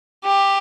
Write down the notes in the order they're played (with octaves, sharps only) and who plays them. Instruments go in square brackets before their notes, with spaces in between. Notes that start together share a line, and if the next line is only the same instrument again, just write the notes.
[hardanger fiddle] G4